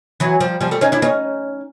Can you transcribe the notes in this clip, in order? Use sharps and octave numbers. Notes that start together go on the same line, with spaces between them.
E3 F#3
F3 G3
F3 G3
G3 A3
C#4 D#4
D4 E4
C#4 D#4